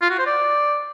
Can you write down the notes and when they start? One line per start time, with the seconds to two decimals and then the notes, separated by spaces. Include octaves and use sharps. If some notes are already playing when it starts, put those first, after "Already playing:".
0.02 F4
0.10 F#4
0.18 C5
0.27 D5